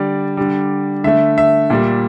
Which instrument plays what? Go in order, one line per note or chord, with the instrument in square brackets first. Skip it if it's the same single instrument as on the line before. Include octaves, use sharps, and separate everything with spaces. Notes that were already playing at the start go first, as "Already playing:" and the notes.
Already playing: [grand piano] D3 G3 D5
D3 G3
D3 A3 E5
E5
A#2 G3